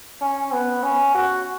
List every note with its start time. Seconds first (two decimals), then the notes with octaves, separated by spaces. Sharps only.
0.21 C#4
0.52 B3
0.83 C#4
1.15 F#4